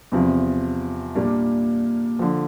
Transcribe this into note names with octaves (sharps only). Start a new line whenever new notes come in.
E2 C3 F3
A#2 G3 A#3 D4
D3 F3